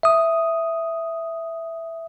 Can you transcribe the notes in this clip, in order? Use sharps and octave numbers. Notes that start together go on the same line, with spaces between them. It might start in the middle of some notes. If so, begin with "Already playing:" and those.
E5 D#6